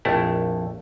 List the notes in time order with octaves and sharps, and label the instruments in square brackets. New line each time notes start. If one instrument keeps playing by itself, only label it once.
[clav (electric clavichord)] A#1 F2 A3 E4